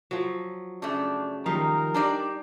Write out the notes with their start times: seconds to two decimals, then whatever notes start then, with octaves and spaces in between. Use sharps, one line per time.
0.11 F3 F#3
0.82 F#2 C#3 A3 D4
1.46 D#3 F3 G3 D#4 A#4 F5
1.94 D4 G4 D5 D#5 G5 A5